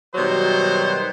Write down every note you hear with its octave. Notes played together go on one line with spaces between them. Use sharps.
B2 D#3 F#3 G3 C5